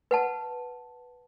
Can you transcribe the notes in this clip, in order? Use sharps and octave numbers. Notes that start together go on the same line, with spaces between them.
B4 F#5 A5